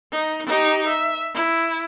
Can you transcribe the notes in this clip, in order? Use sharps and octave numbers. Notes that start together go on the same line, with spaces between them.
D#4
D#4 G4
E5
E4